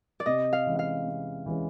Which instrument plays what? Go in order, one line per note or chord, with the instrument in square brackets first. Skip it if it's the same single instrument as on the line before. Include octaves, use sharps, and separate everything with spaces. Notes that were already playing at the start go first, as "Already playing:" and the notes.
[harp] D5
[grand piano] C3 [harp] D#5
[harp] F5
[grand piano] E3 G#3 C#4
[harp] F5
[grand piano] C3
E3 G#3 C#4